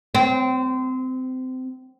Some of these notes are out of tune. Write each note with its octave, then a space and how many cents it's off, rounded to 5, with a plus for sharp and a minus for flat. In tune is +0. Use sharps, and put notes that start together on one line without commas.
C4 -25